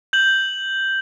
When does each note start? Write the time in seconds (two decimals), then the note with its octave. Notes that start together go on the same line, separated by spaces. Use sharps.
0.13 G6 F#7